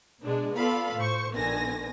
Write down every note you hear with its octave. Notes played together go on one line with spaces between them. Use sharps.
B2 G#3 D4
B3 F4 A4 D5 F5 B5
A2 C5 C#6
A#1 D3 D#3 B3 G#5 A#6